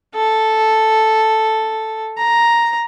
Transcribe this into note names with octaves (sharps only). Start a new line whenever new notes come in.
A4
A#5